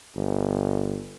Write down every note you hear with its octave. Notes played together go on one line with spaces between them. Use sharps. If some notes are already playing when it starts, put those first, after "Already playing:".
G1